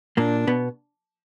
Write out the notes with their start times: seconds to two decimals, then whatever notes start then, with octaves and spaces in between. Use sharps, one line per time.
0.17 A#2 A#3 D4
0.47 B2 B3